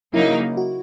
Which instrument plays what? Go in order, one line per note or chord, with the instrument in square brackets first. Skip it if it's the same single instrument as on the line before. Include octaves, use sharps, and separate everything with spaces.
[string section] C#3 F#3 A#3 D#4 [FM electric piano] E4
[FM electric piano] F#4